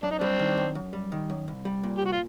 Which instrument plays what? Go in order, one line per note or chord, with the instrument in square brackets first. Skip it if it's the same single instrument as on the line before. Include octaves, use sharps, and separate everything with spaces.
[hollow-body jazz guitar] F#2 [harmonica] D4
[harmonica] D#4
[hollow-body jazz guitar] G3 [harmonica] C4 D4
[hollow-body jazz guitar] D#3
F#2
F#2
G3
D#3
F#2
C2
G3
A#2
[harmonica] G4
[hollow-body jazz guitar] C2 [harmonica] F#4
[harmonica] F4